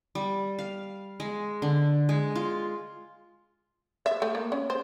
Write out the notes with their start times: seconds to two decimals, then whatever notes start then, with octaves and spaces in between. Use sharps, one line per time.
0.15 G3
0.59 F5
1.20 G#3
1.62 D3
2.09 G#3
2.36 F4
4.06 E5
4.22 A3
4.35 A#3
4.52 C#4
4.70 C5